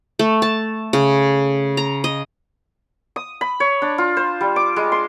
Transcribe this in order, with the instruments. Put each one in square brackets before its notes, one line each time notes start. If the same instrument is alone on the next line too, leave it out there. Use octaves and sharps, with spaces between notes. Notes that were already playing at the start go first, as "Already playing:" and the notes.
[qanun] A3
A5
C#3
A#5
D#5
[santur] D#6
B5
C#5
D4
F4
C5
G3
D6
G#3
C6